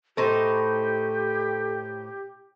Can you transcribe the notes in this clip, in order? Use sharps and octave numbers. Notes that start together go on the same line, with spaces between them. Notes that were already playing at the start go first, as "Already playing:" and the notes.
A2 D#4 G4 A4 C5